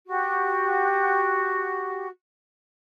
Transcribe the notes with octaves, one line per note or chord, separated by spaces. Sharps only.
F#4 G4